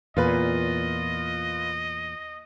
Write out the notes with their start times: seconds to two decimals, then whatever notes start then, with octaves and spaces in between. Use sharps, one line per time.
0.17 E2 A#2 F4 B4 D#5